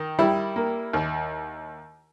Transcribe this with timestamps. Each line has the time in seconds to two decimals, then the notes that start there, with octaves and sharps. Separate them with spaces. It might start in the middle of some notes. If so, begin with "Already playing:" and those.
Already playing: D#3
0.19 G3 E4
0.56 A#3
0.93 D#2